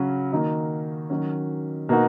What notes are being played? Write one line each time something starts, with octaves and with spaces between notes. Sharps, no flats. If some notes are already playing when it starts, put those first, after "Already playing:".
Already playing: C#3 F#3 C#4 F#4
D#3 A#3 D#4 F#4
D#3 F#3 C#4 F#4
B2 A#3 D#4 F#4